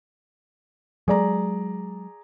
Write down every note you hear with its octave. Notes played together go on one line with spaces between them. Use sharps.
F#3 G#3 G#4 D5 A#5